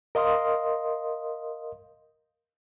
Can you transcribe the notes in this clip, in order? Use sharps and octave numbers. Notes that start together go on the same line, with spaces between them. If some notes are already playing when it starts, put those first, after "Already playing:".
A#4 D#5 F5 C6 D#6